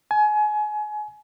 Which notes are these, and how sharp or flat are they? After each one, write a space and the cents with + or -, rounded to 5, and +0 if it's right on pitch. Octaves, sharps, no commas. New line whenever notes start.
G#5 +30